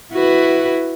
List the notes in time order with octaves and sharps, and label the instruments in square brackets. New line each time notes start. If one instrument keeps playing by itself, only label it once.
[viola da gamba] E4 F#4 B4